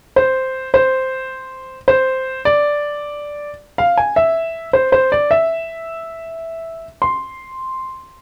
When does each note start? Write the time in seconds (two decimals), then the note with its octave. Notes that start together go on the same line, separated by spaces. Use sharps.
0.16 C5
0.74 C5
1.88 C5
2.45 D5
3.78 F5
3.97 G#5
4.16 E5
4.73 C5
4.92 C5
5.12 D5
5.31 E5
7.02 C6